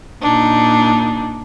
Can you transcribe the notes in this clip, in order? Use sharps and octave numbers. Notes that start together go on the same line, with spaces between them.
A#2 D4 D#4